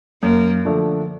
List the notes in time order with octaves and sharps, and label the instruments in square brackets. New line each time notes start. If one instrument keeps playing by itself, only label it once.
[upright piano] F#2 [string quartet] A#3
[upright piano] D3 F3 A3 D4